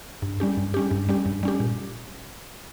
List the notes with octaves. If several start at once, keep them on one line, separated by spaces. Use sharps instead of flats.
G2
G3 C#4 G4
G2
G3 C#4 G4
G2
G3 C#4 G4
G2
G3 C#4 G4
A#2